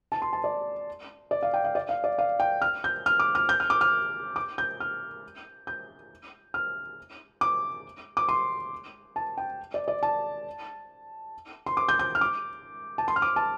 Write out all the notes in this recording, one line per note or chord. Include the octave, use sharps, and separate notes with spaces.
A5
C6
A5
D5
D5
F5
G5
F5
D5
F5
D5
F5
G5
F6
G6
F6
D6
F6
G6
F6
D6
F6
D6
G6
F6
G6
F6
D6
D6
C6
A5
G5
D5
D5
A5
C6
D6
G6
G6
F6
D6
A5
C6
F6
D6
A5